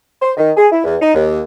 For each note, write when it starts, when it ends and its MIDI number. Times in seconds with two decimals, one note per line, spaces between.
0.22 0.31 72
0.37 0.50 51
0.57 0.67 68
0.72 0.83 64
0.85 0.96 40
1.01 1.12 63
1.14 1.41 39